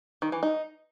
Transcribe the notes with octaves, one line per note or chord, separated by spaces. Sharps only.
D#3
E3
D#4